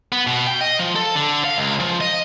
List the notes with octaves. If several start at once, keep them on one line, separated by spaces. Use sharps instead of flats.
B3
B2
G5
D#5
F3
A4
D3
F5
C#2
F3
D#5